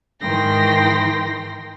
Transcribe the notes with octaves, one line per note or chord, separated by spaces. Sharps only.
G#2 D#3 E3 G5 C6 A#6